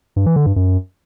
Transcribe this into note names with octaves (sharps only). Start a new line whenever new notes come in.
G2
E3
D3
G2
F#2